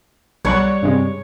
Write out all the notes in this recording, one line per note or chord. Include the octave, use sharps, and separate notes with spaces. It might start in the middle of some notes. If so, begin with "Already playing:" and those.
B1 G3 C#5 D5 F#5 C#6 F#6
G2 C3 G#3